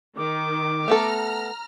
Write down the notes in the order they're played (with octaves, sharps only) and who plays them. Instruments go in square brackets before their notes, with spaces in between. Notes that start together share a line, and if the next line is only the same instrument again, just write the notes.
[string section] D#3 [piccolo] D6
[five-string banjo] A3 B3 A4 [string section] A#5 F6